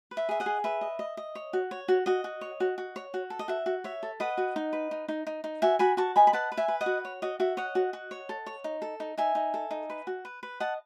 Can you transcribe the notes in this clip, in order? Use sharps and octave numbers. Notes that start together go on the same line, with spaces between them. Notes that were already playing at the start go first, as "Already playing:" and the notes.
B4
E5
G#4 E5
D#5 F#5
G#4
B4 E5
D#5
D#5
D#5
C#5
F#4
C#5
F#4
F#4 D#5
F#4
C#5
F#4
F#4
C#5
F#4
A4
D#5
F#4 E5
F#4
C#5 E5
A4
B4 D#5 F#5
F#4
D#4
B4
D#4
D#4
D#4
D#4
F#4 E5 G#5
F#4 G#5 B5
F#4 A5 C#6
D#5 G#5 B5
B5
B4 F#5 A5
B4
E5 G#5
B4
D#5 F#5
F#4
C#5
F#4 D#5
F#4 E5
C#5 D#5 F#5
F#4
F#4
C#5
A4
C#5
D#4
A4
D#4
D#4 E5 G#5
D#4
A4
D#4
B4
F#4
B4
B4
D#5 F#5 A5